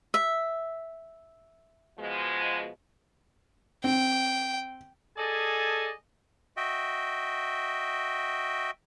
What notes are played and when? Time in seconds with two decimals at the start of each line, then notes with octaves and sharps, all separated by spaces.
0.14 E5
1.98 B2 F3 G#3
3.84 C4 G5
5.17 G#4 A4 D5 D#5 G#5 A5
6.57 F#4 D#5 E5 G5